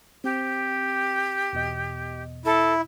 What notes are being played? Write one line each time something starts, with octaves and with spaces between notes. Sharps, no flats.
C4 G4
E2 B2 D#5
E4 A4